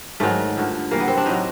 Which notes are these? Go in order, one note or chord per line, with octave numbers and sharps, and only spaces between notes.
G#2 D#3 F#3 A3
G2 D3 F3
C3 E3 G3 A#3
B3
C4
D4
A2 F#3 D#4